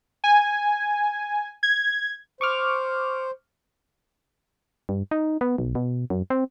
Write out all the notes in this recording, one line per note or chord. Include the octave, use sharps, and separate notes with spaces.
G#5
G#6
C5 C#6 D6 F6
G2
D#4
B3
B1
B2
F#2
C4